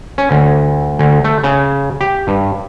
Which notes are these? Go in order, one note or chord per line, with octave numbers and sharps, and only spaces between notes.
C#4
D2
D2
A3
C#3
G4
G2